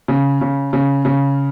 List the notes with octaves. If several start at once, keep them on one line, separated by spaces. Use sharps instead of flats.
C#3
C#3
C#3
C#3